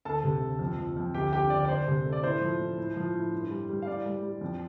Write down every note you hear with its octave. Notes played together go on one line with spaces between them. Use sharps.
D2 A4 A5
C3
D2
F2
F3
F2
D2 G4 G5
D3 G4 G5
D2 D5
D5
D2 C5
C3
A3
D5
A2 C5
F3
A2
A2
F3
A2
G2
G3
G3
F5
A2 D5
G3
G3
F2